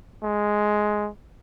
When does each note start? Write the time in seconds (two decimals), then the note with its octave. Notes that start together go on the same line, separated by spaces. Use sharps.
0.24 G#3